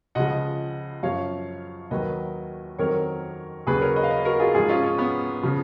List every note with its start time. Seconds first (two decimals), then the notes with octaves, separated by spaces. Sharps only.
0.15 C#2 C#3 F3 D#5 F#5
1.03 F#2 F3 C#5 F5
1.91 D#2 D#3 F#3 B4 D#5
2.78 F2 D#3 F#3 A#4 C#5
3.66 D#2 C#3 F#3 G#4 B4
3.81 A#4 C#5
3.96 B4 D#5
4.03 F5
4.10 B4 D#5
4.25 F#4 A#4
4.39 F4 G#4
4.54 G#2 F3 F4 G#4
4.69 C#4 F4
4.84 C#4
4.98 B3
5.43 C#3 F3